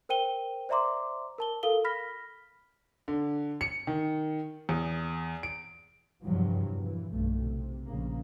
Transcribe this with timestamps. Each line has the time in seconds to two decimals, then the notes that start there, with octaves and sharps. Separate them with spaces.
0.09 A#4 C5 G5 D#7 G7
0.69 C5 D5 E5 A#5 C6 D6
1.38 A#4 A5 G7
1.63 F4 A4 A#4 F5 G7
1.84 B5 F6 A#6 B6
3.08 D3
3.61 C#7
3.87 D#3
4.69 E2
5.43 D7
6.24 E2 G2 C3 F3 F#3
6.80 A#2 E3
7.12 B1 G2 A#2 A3
7.44 C3
7.87 A#1 C#3 A#3